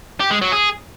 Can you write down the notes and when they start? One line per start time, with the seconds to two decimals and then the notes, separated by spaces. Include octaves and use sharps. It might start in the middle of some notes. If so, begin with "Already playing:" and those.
0.20 G4
0.31 G#3
0.41 F#3
0.52 G#4